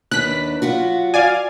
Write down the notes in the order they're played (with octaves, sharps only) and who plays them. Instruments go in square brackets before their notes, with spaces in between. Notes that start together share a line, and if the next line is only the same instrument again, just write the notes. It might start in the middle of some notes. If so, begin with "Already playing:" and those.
[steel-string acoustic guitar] D#2 D4 B4 [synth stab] F#6 B6
[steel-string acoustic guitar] F#3 F4 F#4
[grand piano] D5 [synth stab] F5 G#5